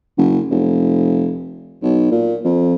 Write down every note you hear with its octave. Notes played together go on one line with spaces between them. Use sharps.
F#1
F1
B1
A#2
F2